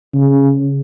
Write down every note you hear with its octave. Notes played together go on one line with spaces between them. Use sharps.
C#3